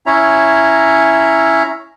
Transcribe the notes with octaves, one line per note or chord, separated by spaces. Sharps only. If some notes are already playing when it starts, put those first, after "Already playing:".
C#4 E4 C#5 E5 A#5